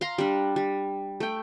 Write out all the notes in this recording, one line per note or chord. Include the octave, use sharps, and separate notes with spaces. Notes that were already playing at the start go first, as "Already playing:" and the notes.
F5 A#5 C6
G3 D4
G3
A3 G5